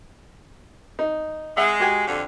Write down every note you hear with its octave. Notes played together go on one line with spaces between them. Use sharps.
D#4
G#3 E5 F#5
F#4 G4 G#5
F2 D3